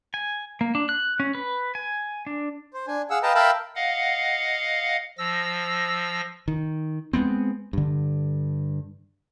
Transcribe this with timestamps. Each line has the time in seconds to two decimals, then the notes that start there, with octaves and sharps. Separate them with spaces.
0.14 G#5
0.61 A#3
0.75 D4
0.89 F#6
1.20 C#4
1.35 B4
1.75 G#5
2.26 D4
2.73 C5
2.87 D4 G#5
3.10 G#4 F5 F#5 E6
3.23 B4 D#5 F5 G5 A5 A#5
3.35 A#4 E5 F5 G5 A5 B5
3.75 D#5 F5 F#5
5.18 F3 E6 A#6
6.48 D#3
7.13 G#3 A3 B3 C4
7.73 G2 D3